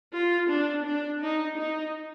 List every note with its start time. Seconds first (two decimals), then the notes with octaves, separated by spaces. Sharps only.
0.13 F4
0.49 D4
0.85 D4
1.21 D#4
1.57 D#4